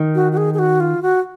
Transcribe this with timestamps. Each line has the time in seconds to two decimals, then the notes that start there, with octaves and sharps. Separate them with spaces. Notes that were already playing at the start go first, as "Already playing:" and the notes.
Already playing: D#3
0.15 F#4
0.32 F#4
0.37 G#4
0.54 G#4
0.59 F#4
0.80 F4
1.02 F#4